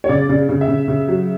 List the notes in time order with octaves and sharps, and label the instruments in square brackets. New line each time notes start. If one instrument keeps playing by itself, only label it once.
[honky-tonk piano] C#5
C#3 D5
C#3
C#3
E5
C#3
C#3
F#3